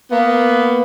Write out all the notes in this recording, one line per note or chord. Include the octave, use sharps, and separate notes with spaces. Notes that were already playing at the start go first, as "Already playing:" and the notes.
A#3 B3